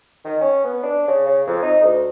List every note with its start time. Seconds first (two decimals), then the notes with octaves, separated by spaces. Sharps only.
0.25 D#3
0.41 C#4
0.64 B3
0.83 D4
1.07 C#3
1.27 C#3
1.47 F2
1.62 D#4
1.82 D2